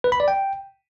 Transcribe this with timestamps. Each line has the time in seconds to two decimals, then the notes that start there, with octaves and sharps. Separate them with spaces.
0.04 B4
0.12 B5
0.20 D5
0.28 G5